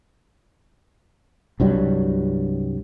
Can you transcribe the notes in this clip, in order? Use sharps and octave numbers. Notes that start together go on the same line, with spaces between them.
C2 G2 F#3 G3